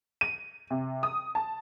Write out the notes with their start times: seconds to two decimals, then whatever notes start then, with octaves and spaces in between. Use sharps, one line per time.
0.21 D#7
0.71 C3
1.03 D#6
1.35 A5